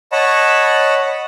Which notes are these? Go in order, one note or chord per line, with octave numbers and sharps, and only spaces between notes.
C#5 D#5 F#5 A5 B5